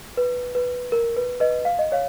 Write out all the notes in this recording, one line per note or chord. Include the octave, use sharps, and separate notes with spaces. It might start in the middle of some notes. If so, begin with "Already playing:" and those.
B4
B4
A#4
B4
B4 D#5
F5
D#5
C#5 F5